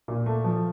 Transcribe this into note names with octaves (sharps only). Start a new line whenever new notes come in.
A#2
A3
F3